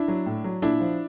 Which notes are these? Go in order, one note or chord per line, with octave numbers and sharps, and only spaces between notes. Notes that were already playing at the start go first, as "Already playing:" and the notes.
Already playing: D4 E4
F#3
A2
F#3
A#2 D4 E4
F3